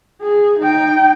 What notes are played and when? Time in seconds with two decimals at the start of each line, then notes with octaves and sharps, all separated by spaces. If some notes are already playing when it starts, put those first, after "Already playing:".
0.22 G#4
0.59 D#4 G5